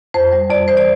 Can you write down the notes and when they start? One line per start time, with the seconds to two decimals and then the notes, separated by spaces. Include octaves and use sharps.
0.14 F2 C5
0.32 G3
0.50 F2 D5
0.68 E3 C5
0.77 D5